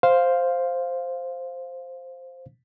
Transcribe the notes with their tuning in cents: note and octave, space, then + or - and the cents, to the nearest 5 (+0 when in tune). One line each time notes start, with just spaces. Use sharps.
C5 +0 F5 +0